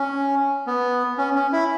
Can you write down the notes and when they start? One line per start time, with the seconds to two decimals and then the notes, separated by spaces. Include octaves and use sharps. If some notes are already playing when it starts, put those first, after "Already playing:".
Already playing: C#4
0.67 B3
1.18 C#4
1.35 C#4
1.52 E4